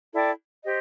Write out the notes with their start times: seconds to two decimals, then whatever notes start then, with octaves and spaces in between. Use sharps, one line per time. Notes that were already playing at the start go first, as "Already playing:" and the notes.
0.13 E4 A4 D5 G5
0.63 G4 C5 D#5